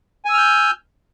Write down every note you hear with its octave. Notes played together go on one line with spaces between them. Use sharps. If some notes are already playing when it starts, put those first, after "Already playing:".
G#5 E6 F6 G6